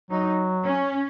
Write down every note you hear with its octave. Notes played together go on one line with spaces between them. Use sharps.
F#3 D#4
C#4